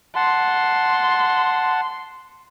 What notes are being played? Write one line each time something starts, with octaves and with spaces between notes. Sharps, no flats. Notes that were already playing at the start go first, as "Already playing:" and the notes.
F#5 A5 C6